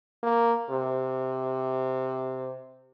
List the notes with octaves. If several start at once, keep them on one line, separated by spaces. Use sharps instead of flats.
A#3
C3